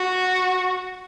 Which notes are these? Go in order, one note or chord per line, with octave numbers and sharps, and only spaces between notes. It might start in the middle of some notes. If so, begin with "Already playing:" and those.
Already playing: F#4